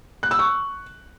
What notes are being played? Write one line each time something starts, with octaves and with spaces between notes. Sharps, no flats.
F#6
E6
C#6